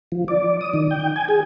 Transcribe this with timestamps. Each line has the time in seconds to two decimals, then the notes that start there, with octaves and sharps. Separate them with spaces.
0.12 F3
0.28 D5
0.61 D#6
0.73 D#3
0.91 G5
1.16 G#5
1.29 G#4